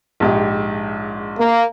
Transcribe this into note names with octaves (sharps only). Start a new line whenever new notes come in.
A#1 G#2 G4
A#3